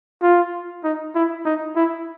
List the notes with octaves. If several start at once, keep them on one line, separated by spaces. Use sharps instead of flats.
F4
D#4
E4
D#4
E4